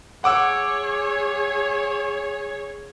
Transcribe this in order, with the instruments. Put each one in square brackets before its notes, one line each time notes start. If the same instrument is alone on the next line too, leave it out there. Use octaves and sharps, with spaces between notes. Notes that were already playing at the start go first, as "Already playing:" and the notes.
[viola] G#4 C#5 [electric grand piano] F#5 D6 E6